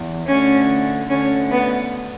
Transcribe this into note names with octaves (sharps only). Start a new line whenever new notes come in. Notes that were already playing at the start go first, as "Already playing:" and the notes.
Already playing: E2
D2 D3 C#4
D2 D3 C#4
B3